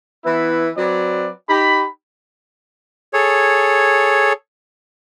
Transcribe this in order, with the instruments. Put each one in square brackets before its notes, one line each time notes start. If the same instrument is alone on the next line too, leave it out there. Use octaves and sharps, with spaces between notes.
[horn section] E3 B3 E4 B4
F#3 C4 B4 D5
D#4 G4 B5
[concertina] G#4 A4 C#5